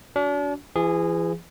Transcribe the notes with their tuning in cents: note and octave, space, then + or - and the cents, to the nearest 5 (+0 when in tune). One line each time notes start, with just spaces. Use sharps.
D4 -40 F#4 +0
E3 +40 G#4 -15